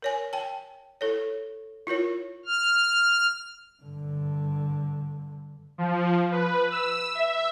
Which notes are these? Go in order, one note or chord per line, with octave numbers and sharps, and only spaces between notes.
A#4 C#5 G#5
G5 A5
E4 A4 C#5
E4 F4 A#4 C#5
F6
G2 D3
F3
B4
E6
E5